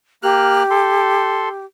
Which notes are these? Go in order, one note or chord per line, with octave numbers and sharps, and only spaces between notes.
A#3 G4 F6 F#6
A4 C6